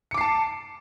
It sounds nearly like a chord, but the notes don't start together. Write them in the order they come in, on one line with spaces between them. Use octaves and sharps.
C#7 D6 C7 A5